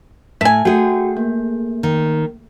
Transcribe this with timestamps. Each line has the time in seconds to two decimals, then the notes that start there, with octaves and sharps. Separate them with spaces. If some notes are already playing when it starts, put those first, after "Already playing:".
0.41 A2 E5 G#5
0.65 A3 F#4 G#4 G5
1.17 A#3
1.83 D#3